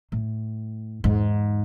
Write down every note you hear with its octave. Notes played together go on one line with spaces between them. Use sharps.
A2
E2 G#2